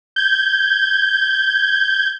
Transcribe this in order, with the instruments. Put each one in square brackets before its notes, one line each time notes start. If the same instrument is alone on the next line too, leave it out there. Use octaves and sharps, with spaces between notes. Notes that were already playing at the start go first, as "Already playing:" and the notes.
[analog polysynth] G6 G#6